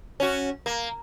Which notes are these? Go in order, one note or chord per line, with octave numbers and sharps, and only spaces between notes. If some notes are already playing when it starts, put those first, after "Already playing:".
C#4 F#4
A#3